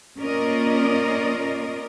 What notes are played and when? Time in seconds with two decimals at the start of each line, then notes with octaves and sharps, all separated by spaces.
0.20 A#3 C#4 F4 A#4 D5 D#5